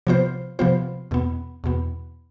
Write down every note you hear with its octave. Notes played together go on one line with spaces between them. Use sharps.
C3 F3 B3 F4 C5
C3 F3 B3 F4 C5
E2 B2 B3
E2 B2 B3